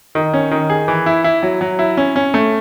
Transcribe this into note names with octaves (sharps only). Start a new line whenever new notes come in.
D#3
C#4
D#3
G#4
E3
E4
E4
F#3
F#3
E4
C#4
C#4
A3